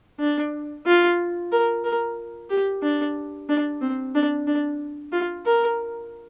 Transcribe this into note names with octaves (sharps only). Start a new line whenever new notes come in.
D4
F4
A#4
A#4
G4
D4
D4
C4
D4
D4
F4
A#4